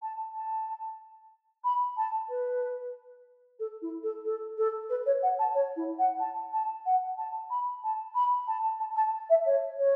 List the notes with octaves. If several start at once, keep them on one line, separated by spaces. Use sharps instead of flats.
A5
A5
B5
A5
B4
A4
E4
A4
A4
A4
B4
C#5
F#5
A5
C#5
E4
F#5
A5
A5
F#5
A5
B5
A5
B5
A5
A5
A5
E5
C#5
C#5